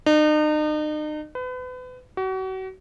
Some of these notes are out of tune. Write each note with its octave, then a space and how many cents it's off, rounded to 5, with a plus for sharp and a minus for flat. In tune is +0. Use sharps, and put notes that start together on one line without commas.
D#4 -40
B4 +35
F#4 +35